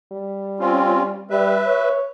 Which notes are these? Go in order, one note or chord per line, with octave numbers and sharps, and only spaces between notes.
G3
C4 C#4 F4
G3 B4 E5
C#5